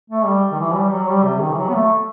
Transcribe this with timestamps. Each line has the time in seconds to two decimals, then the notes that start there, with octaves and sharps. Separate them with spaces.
0.10 A3
0.26 G3
0.52 D#3
0.59 E3
0.75 G3
0.91 F#3
1.08 G3
1.25 C3
1.40 D#3
1.52 E3
1.58 F#3
1.69 B3
1.74 A3